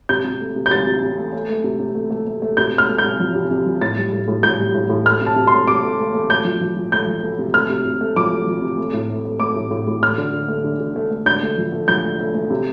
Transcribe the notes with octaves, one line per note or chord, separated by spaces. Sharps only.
C3 G6
C3
A3
C3
G6
C3 A6
C3
C3
A3
A3
A3
C3
C3
A3
A3
A3
A3
C3 G6
A3 F6
A3
G6
C3
F3
C3
C3
F3
A2 A6
G3
A2
A2
A2 G6
G3
A2
A2
A3 F6
C3
A5
C3
A3 C6
C3 D6
A3
A3
A3
A3 G6
F3
F3
F3
A3 G6
F3
A3
C3
A3 F6
C3
C3
A3
F3 D6
A3
F3
C3
A3
A2
A3
A3
A3 D6
A2
A2
A2
A3 F6
D3
D3
A3
D3
D3
A3
A3
D3 G6
A3
F3
A3
F3 G6
A3
A3
A3
C3